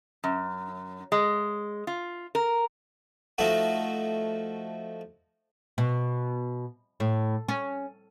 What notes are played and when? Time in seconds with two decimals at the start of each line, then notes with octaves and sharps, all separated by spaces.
0.24 F#2
1.12 G#3
1.87 F4
2.35 A#4
3.38 F3 A3 D#4 F#4
5.78 B2
7.00 A2
7.48 C#4